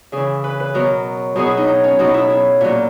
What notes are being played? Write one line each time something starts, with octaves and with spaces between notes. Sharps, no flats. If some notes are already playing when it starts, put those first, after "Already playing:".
C#3 E3 G#4
B4
B4
B2 F#3 A#4
B2 F#3 G#4
E4
D#4
D#4
C#4
B2 F#3 D#4
E4
E4
A#2 F#3